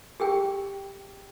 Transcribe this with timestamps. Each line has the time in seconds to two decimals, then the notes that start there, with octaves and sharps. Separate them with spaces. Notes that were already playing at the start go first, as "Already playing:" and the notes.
0.20 G4 G#4 G5